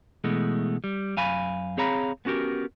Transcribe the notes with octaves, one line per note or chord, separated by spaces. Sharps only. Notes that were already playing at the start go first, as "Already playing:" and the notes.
B2 E3 G#3 A3
G3
F#2 F5 G#5 B5
C4 G#4 C#5 F5 A#5 B5
B3 C#4 F#4 G4 A#4